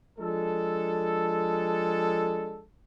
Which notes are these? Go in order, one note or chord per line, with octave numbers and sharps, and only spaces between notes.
F3 G#3 D4 A4